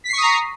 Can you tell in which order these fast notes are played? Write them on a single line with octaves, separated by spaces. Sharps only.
B6 C7 C#6 D#6 A#5